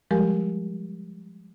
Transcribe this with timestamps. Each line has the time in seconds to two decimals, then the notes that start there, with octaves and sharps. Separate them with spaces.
0.11 F3 G3 G#3 G4 A#4